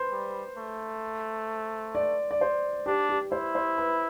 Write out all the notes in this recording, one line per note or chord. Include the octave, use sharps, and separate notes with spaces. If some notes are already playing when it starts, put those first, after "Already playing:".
Already playing: B4 C5
G3
A3
D5
D5
C5
D4 G4
G4
E4 C5
C5
B4